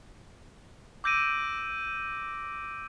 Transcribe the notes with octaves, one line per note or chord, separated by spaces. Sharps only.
D6 E6 G6 A#6 D7 D#7